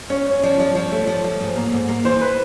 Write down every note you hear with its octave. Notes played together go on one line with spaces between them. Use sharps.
C#4 C#5
C#4 C#5
F3 D5
F3 D5
F3 C#5
A3
F3
F3
G#2
A#3
G#2
A#3
E3 C5
B4